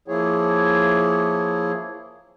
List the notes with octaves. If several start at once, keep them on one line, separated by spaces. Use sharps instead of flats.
F3 A#3 E4 G#4 C#5